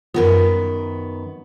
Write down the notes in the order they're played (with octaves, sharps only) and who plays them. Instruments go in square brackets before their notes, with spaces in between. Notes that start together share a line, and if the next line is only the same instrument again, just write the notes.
[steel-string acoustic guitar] F#2 D#3 B3 [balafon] F4 A#4